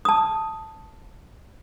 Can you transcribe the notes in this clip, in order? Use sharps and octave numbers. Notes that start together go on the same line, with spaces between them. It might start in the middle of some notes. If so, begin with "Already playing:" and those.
A5 D#6